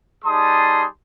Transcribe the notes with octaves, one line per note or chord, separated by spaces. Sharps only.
G3 D#4 G#4 A5 C6 D#6